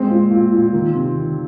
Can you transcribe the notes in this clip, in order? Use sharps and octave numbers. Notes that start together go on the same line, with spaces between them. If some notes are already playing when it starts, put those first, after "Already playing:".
Already playing: G#3 C4
A#2
A#2
A#2
D#3
C3
D#3